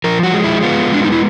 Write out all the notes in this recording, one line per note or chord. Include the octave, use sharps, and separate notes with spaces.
F3 A#4
F#4
G#3
E4
B3 F4
G#3 D4
D#4
E4